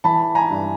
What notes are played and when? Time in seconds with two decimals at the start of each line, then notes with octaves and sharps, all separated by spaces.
0.04 E3 A5 B5
0.35 G#5 A#5
0.50 G2